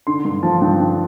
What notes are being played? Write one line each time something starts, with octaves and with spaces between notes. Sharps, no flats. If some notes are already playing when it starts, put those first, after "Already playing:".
D3 C6
G2 C6
F3 A5
A5
G2 G5
D3